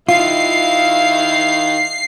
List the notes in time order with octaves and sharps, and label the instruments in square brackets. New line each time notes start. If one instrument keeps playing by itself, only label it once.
[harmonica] D#3 F5 [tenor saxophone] E4 [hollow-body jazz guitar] F4 [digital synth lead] C7